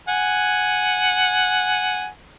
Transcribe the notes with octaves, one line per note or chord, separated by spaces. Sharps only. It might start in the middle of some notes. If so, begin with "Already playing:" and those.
F#5 G#5